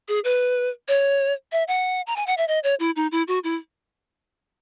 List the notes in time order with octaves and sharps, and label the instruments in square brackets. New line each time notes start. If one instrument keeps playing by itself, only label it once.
[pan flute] G#4
B4
C#5
E5
F#5
A#5
G#5
F#5
E5
D#5
C#5
E4
D#4
E4
F#4
E4